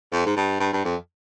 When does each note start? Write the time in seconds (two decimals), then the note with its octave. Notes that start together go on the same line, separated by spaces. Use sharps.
0.12 F2
0.26 G#2
0.36 G2
0.60 G2
0.73 G2
0.85 F2